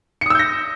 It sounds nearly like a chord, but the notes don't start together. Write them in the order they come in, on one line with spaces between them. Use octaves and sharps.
C#7 D#6 E6 G6 A#6